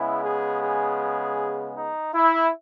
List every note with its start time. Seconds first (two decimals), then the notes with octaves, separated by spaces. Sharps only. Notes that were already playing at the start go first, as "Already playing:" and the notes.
Already playing: C#3 G#3 B3 E4
0.24 G#4
0.62 G#4
1.76 D#4
2.14 E4